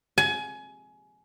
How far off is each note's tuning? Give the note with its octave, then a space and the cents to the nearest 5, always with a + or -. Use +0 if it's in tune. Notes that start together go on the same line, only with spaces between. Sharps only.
G#5 +25